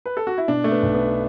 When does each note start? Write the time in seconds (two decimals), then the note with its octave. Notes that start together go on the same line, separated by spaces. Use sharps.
0.06 B4
0.17 A4
0.27 F#4
0.38 E4
0.48 B2 D4
0.64 A3
0.71 B3
0.83 B1
0.94 B3